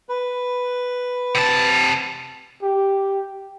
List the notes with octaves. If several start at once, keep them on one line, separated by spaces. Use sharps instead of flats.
B4
C3 A5
G4